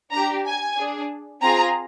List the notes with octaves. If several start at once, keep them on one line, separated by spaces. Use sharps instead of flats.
D4 G4 A#5
G#5
D4 G#4
C4 F4 G#4 A#5